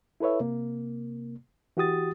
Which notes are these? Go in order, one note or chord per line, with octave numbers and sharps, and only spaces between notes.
E4 A4 B4 C#5 E5
C3 A#3
E3 F#4 G4 D#6 A6